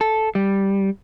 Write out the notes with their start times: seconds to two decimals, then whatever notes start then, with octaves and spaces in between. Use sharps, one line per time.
0.01 A4
0.35 G3